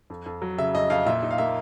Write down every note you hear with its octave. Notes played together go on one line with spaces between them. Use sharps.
F2
F2
F#3
C#3 E5
F2 D#5
F2 F5
A#2 E5
D#4
F5
A#3 E5